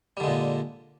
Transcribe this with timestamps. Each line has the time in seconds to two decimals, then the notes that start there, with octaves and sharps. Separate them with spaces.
0.17 G3
0.20 D3
0.24 G#3
0.27 A#2